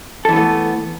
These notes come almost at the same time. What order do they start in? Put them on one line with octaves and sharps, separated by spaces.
A4 E3 B3 A3